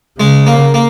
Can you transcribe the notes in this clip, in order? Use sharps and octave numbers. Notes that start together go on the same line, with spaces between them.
C#3 G#3
A#3
A#3